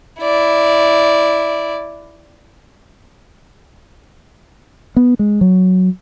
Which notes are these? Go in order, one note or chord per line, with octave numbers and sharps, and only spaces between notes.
E4 D5
B3
G#3
F#3